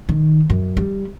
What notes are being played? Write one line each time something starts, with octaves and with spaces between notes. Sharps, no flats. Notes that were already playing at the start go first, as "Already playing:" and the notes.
D#3
F#2
G3